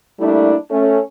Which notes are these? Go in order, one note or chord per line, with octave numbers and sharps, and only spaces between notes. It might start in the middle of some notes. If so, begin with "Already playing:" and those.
G3 A3 A#3 D4 E4
A3 C#4